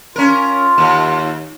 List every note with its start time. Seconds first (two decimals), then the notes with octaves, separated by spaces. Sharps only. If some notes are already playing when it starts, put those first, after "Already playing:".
0.16 C#4 F4 A#4
0.78 D#2